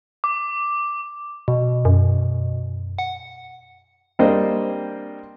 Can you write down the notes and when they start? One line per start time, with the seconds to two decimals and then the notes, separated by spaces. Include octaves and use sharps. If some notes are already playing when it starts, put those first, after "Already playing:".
0.24 D6
1.48 B2
1.85 F#2
2.99 F#5
4.19 G3 A#3 C4 D4 C5 D#5